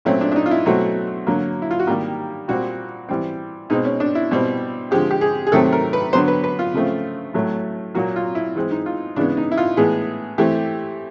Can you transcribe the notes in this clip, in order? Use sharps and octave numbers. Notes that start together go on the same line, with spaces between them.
A#2 F#3 A3 C4 C#4
D4
D4
D#4
F4
E4
B2 F#3 A3 C4 F#4
D3 F#3 A#3
E4
F4
F#4
D#3 G3 A#3 G4
A#2 G3 C4 F#4
E3 G3 C4
B2 G#3 C4 D#4
C#4
D4
E4
B2 G3 C4
D3 F3 G#3 C4 G4
G4
G#4
G#4
C3 D#3 F#3 A3 C4 A4
A#4
B4
D3 F#3 B3 C5
B4
B4
F4
C#3 F3 A3 C4
A2 F#3 A3
A#2 F#3 A#3 F#4
F4
E4
E3 G#3 C4
D#4
F4
C#3 E3 G#3 B3 D4
D#4
E4
F4
A2 E3 G#3 B3 G#4
E3 A3 C4 G4